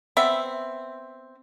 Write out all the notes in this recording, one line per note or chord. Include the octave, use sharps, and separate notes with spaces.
B3 C4 E5